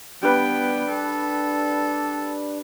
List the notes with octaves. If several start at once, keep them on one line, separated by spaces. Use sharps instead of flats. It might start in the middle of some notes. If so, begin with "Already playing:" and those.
G3 B3 D4 B4 G5
A4